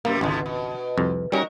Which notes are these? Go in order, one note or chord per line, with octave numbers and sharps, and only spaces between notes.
F#2 C3 G3 A#3
G#1 C#2 G#2 B2 D3
B2
C2 F2
G3 C#4 D#4 F#4 A#4